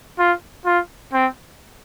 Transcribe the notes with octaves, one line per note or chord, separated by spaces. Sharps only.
F4
F4
C4